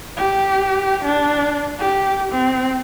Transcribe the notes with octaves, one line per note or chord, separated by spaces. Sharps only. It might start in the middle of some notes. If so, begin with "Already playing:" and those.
G4
D4
G4
C4